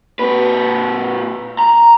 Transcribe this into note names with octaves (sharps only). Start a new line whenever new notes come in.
A#2 B4
A#5